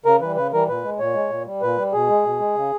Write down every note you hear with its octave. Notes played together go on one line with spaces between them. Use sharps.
C#3 A#4
E3 G3 B4
C#3 B4
E3 G3 A#4
A#2 B4
G#3
A#2 C#5
G#3
A#2
G3
A#2 B4
G3
B2 G#4
G#3
B2
G#3
C#3